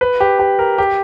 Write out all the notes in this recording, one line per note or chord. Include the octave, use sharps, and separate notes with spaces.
B4
G4
G4
A#4
G4